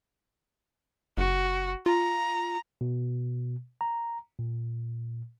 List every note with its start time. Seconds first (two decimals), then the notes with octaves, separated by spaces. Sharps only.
1.17 F#1 F#4
1.86 F4 A#5
2.81 B2
3.81 A#5
4.39 A#2